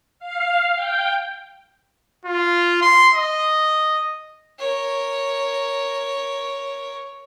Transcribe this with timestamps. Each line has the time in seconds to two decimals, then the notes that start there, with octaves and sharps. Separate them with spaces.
0.19 F5
0.75 G5
2.25 F4
2.82 C6
3.14 D#5
4.58 A#4 C#5